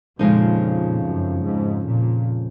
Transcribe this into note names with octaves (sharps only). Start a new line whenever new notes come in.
F2 A#2 C#3 F3 G#3 D#4
F#2
G#2
A#2